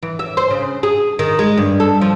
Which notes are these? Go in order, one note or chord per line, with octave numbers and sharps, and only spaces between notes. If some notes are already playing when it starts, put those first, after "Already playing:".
E3
E5
C5
C#3
G#4
D#3
G#3
G2
A4
F3